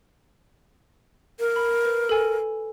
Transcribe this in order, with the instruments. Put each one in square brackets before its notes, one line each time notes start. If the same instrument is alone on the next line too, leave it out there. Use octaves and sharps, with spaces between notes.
[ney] A#4
[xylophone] B5
B4
A4 G#5